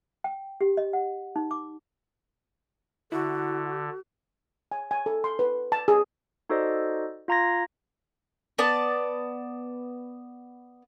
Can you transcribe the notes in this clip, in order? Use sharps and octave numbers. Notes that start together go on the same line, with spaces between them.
G5
G4
D#5
F#5
D#4
D6
D3 E4 F#4
G#5
G#5
A4
C6
B4
A5
G#4
D#4 F#4 A4 C5 D5 D#5
F4 F5 A#5 C6 G#6 A#6
B3 D5 A5